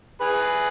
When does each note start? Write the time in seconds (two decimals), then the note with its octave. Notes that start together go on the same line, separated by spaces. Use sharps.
0.21 G#4 B4